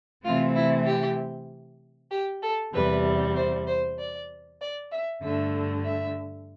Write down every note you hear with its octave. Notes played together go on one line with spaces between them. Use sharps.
C3 E3 A3 C4 F4
E4
G4
G4
A4
E2 C3 G3 B4
C5
C5
D5
D5
E5
G2 D3 A3 E5
E5